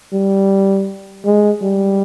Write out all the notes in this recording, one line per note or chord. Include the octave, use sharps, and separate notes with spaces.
G3
G#3
G3